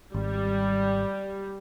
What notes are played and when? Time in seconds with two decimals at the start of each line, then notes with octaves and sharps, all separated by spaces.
0.14 G#1 G3